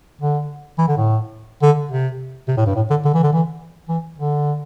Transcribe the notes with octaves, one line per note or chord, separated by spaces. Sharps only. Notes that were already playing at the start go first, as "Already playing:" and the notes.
D3
E3
D3
A2
D3
C3
C3
A2
G2
A2
D3
D3
E3
D3
E3
E3
D3